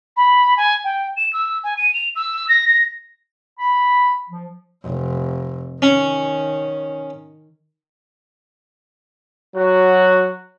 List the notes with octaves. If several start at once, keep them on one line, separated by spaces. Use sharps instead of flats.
B5
G#5
G5
E7
E6
G#5
D#7
F7
E6
A#6
A#6
B5
F3
F1
D#3 C#4
F#3 F#4